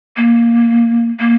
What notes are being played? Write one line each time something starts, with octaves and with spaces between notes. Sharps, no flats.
A#3
A#3